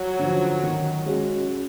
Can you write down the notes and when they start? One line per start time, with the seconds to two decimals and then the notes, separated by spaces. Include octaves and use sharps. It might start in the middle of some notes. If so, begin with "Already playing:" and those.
Already playing: F#3
0.19 D3 F3
0.64 D#3
1.06 G#3 C#4 F#4